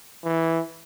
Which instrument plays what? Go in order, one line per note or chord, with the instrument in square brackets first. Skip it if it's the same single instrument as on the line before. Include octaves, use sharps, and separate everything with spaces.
[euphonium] E3